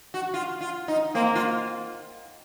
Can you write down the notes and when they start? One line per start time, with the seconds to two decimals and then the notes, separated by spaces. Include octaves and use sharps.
0.14 F#4
0.34 F4
0.61 F4
0.88 D#4
1.15 A#3 C4
1.35 F4